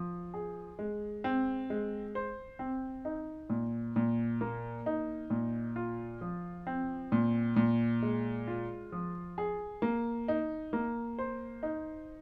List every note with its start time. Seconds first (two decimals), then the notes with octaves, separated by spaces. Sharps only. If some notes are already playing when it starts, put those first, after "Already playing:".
Already playing: F3
0.34 G#4
0.79 G#3
1.24 C4
1.70 G#3
2.15 C5
2.59 C4
3.05 D#4
3.50 A#2
3.96 A#2
4.41 A#3
4.86 D#4
5.30 A#2
5.76 F4
6.21 F3
6.67 C4
7.12 A#2
7.56 A#2
8.03 G#3
8.48 F4
8.92 F3
9.38 G#4
9.82 A#3
10.28 D#4
10.73 A#3
11.19 C5
11.63 D#4